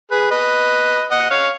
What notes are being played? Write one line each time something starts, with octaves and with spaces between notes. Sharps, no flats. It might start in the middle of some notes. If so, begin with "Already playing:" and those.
G#4 B4
B4 D#5
D#5 F#5
C#5 F5